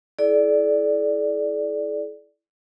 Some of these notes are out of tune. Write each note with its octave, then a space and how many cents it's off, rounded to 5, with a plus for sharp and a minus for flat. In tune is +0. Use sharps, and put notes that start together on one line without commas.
E4 +0 A4 -45 D5 +0